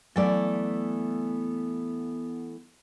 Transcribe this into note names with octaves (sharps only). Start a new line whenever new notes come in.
E3 F#3 A3 B3 D5